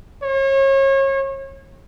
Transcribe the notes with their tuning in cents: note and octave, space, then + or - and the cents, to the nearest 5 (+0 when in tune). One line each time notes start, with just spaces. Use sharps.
C#5 -35